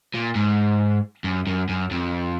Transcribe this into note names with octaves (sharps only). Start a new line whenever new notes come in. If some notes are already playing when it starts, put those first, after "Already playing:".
A#2
G#2
F#2
F#2
F#2
F2